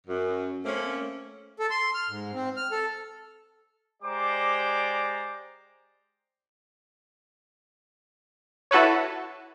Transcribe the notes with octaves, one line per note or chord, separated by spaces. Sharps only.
F#2
A3 A#3 C4 C#4
A4
C6
F6
G#2
C4
F6
A4
G#3 G4 C5 D5 A#5 D6
E4 F#4 A4 B4 C#5